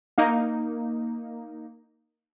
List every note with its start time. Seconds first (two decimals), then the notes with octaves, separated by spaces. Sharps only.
0.18 A#3 D#4